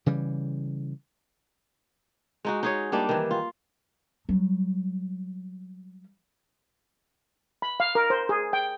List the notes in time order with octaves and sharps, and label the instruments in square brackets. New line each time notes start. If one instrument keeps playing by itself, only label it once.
[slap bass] C#3 E3 G3
[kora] G#3 D#4 F#4
D#4 G#4 C#5
G3 A#3 D4 D#4
D#3 E3
F4
[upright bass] F#3 G3
[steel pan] B5
F5
A#4
C5
G#4
G5